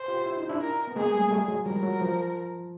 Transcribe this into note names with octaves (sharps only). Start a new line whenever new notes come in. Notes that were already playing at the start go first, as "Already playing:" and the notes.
Already playing: C5
F4 G4
E4
D#4
D4 E4
A#4
B3
G#3 A#3 G#4
G3 A3
G3 A3
F#3 G#3
F3 G3 A#4
F#3
F3